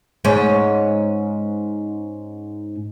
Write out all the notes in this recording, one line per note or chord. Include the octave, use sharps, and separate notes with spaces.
G#2 C#4